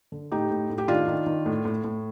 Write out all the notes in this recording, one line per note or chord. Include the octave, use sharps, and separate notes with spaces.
D3
A2 D#4 G4
A2
A2
G4
D#3 D4 F4
D#3
D#3
A2
A2
A2